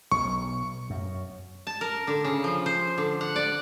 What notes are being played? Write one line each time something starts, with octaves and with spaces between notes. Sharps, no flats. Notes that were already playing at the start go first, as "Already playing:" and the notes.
B1 C#6
F#2
A5
A#4
D3
C#3
F3
C5
D3
F#5
D5